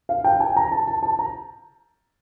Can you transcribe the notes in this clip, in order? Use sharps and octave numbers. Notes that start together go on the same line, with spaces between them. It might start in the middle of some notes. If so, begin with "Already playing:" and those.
F5
G5
G#5
A#5
A5
A5
A5
A#5